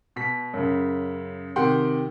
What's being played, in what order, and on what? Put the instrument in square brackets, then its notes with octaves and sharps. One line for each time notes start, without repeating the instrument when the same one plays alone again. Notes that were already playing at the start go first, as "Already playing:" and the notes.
[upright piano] B2 B6
F#2 C#3
C3 D#3 G4 F#5 G5 C6